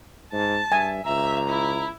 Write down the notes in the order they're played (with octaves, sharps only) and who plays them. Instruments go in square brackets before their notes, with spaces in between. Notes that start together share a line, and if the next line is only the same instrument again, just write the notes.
[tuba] G#2 [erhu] A5
[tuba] G2 [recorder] E5 [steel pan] G#5
[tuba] C#2 [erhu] E5 [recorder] A#5
[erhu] E4